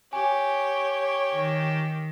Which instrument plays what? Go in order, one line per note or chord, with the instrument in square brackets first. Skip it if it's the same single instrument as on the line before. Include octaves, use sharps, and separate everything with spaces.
[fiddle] G4 [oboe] C#5 [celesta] G#5
[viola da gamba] D#3